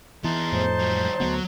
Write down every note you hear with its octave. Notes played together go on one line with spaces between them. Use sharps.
E3 B3 D#4 G#4 A5 C6
F2 A2 C5
F#3 G3
D2 F#3 G3 B3